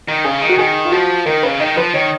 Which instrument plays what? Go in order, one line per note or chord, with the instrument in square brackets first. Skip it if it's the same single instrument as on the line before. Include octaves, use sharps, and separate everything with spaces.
[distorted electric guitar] D#3
[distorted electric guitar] C#3 [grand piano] G#4
[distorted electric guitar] D#3
[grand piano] F#4
[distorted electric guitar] D#3 [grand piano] G#4
[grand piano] F4
[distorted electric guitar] F3 [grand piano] F#4
[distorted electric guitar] D#3 [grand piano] A#4
[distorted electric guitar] C#3 [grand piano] B4
[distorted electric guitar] D#3 [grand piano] D#5
[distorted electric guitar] F3 [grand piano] B4
[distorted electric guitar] D#3 [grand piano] C#5